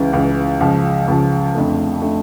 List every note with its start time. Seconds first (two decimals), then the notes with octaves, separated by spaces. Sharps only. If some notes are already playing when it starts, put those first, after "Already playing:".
Already playing: C#2 C#3 E3
0.13 C#2 C#3 E3
0.60 C#2 C#3 F3
1.08 C#2 C#3 F3
1.55 F2 D3 A3
2.02 D3 A3